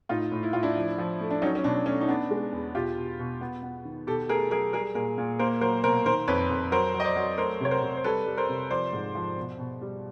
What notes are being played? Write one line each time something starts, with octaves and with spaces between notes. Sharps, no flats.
A2 D#4 F4
A2
E4
A2 F4
D4 E4
F3
F3
A3
D4
F#3 C#4 D#4
C#4
B2 D4
A3 C#4
D#4
B3 D4
G#3
E2
B2 F4 G4
B2
B2
B3
B3
D#3
B2 G4 A4
A3 G#4 A#4
F#3 G#4 A#4
G3 G#4 A#4
A#2 G#4 A#4
A#2
A#3 A#4 C5
F#3 A#4 C5
B2 A#4 C5
D#3 A#4 C5
F2 B4 C#5
F2
F#3 A#4 C5
F#3
D#5
C5 D5
F#3
A3 A#4 C5
C3 C#5
A#4 C5
C3
C5
G3 A4 B4
G3
A#4 C5
C3
F3 C5 D5
G#2
F3
B2
B2
G3